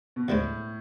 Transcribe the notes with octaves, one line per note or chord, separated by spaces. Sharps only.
B2
D2 A2 D3 G#3 C4